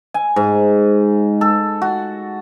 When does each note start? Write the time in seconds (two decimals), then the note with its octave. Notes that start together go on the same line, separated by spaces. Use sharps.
0.14 G#5
0.36 G#2
1.41 A4
1.82 F#4